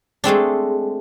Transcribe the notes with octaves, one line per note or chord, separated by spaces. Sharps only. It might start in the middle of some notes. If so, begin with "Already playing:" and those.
G#3 A3 C4 D4